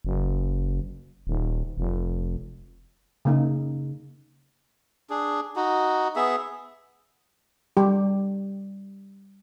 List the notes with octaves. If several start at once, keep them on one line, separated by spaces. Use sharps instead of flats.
F#1
D#1
F1
C#3 A#3 D#4
D4 G#4
D#4 F#4
B3 G#4 E5
G3 G4